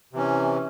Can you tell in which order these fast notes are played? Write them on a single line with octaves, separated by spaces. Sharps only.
C3 E3 C#4